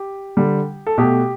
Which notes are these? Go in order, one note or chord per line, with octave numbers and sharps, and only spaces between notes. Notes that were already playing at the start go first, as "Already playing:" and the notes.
Already playing: G4
D3 G3
A4
B2 A3 G4